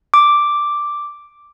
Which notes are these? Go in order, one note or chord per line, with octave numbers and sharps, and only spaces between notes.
D6